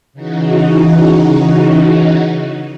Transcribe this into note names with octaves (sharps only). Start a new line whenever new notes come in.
C#3 E3 D#4 F#4